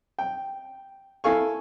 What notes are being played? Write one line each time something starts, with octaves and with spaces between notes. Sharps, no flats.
G5
E4 A4 F5 G#5 C#6